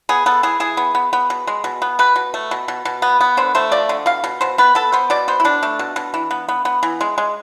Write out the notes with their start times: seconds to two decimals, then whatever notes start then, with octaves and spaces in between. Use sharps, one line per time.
0.09 B3 G#4
0.26 B3 A4
0.43 E3 G#4
0.60 E3 G#4
0.77 B3
0.95 B3
1.13 B3
1.30 B2
1.47 G#3
1.64 B2
1.82 B3
1.99 B2 B4
2.16 B2
2.34 A3
2.51 B2
2.68 B2
2.85 B2
3.02 B3
3.21 B3
3.37 D3 C5
3.55 A3 C5
3.72 F3 D5
3.89 D3
4.06 B2 F5
4.24 B2
4.41 B2 C5
4.58 B3 B4
4.75 B3 A4
4.92 B3 C5
5.10 B2 D5
5.28 B3 C5
5.40 E4
5.45 B2 D4
5.63 A3
5.79 B2
5.96 B2
6.14 E3
6.31 B3
6.49 B3
6.65 B3
6.83 E3
7.01 G#3
7.18 G#3